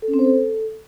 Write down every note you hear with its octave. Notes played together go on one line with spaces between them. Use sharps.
A4
C#4
C4
C5
A4